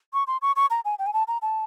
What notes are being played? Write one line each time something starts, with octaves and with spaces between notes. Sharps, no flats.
C#6
C6
C#6
C#6
A#5
G#5
G5
G#5
A5
A#5
A5